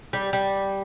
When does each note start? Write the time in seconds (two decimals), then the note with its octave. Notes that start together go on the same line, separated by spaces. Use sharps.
0.13 G3
0.33 G3